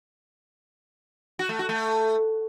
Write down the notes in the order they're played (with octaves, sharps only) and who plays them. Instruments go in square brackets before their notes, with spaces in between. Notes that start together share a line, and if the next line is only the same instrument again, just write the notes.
[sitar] F#4
A3
F#4
A3